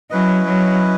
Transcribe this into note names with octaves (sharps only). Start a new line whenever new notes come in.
F#3 C#4 E4 B4 D#5
F#3